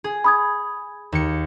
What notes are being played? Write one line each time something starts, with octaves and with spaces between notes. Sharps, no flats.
G#4
B5 D#6 G#6
D#2 C#7